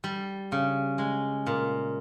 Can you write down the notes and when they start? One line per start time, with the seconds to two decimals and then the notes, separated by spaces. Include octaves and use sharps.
0.04 G3
0.52 C#3
0.98 G#3
1.47 A#2